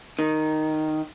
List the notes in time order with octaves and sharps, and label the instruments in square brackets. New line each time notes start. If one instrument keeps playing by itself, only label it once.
[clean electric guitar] D#3